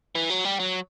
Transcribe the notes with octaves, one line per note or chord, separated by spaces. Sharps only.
E3
F#3
G3
F#3